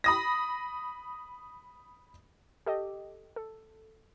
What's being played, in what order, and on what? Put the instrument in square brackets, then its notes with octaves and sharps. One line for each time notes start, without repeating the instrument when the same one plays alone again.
[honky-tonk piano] B5 D#6 A#6
[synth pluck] G4 A4 D#5 G5
A4